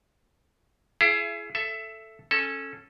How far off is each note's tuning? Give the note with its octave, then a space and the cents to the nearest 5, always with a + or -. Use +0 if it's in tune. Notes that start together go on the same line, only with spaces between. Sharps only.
E4 +30 G#4 +25 E5 +40
A4 +0 E5 +15
C#4 -15 A4 +0 G#5 +0